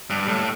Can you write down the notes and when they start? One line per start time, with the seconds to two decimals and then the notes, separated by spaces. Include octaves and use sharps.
0.10 G2
0.28 A2